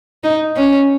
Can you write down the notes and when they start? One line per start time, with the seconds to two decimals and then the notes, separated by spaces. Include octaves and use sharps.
0.24 D#4
0.56 C#4